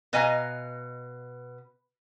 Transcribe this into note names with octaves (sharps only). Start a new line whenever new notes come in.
B2 B4 D#5 F5 G#5 A#5